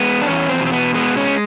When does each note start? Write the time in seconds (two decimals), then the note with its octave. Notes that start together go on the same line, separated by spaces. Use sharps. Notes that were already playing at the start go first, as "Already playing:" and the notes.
Already playing: G#3 B3
0.22 D4
0.27 E2 C#4
0.49 C4
0.61 B2
0.66 C4
0.72 B3
0.94 G#3 B3
1.17 C#4